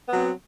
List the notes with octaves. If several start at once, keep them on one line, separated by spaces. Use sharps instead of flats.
F#3 B3 C4